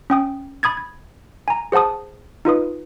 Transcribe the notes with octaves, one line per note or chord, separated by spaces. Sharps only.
C#4 G5 D#6
B5 D#6 G#6 A6
G#6
G#5 A#5
G#4 C5 F#5 A5 D#6
D#4 F4 B4 D#6